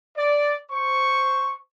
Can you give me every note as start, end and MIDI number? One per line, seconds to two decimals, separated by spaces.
0.16 0.54 74
0.71 1.54 72
0.71 1.54 85